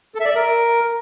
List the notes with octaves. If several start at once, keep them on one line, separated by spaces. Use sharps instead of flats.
A4
E5
D5
E5
A#4